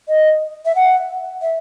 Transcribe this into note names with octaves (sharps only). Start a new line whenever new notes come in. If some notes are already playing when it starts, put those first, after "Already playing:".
D#5
E5
F#5
E5